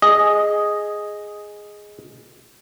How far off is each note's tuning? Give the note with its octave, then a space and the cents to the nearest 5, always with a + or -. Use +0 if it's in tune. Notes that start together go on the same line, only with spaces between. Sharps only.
G#4 +0 D#5 +0